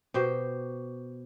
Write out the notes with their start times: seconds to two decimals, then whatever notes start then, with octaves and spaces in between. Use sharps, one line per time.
0.14 B2 G4 C5 G5